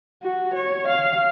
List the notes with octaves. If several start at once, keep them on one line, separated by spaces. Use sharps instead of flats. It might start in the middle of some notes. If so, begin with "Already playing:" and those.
F#4
C#5
F5